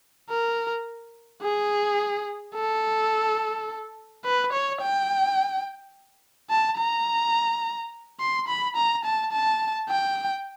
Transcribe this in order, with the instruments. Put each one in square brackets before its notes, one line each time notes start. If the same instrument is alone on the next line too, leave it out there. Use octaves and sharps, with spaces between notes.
[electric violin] A#4
G#4
A4
B4
C#5
G5
A5
A#5
C6
B5
A#5
A5
A5
G5